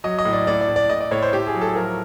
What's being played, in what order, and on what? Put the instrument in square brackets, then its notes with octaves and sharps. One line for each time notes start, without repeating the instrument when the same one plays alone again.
[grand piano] F#3 D#5
D#5
A2
D5
A2 D5
D5
A2
D5
A2 D#5
D5
A2 C#5
C5
A2 G4
G#4
F#3
A4
F3 A#4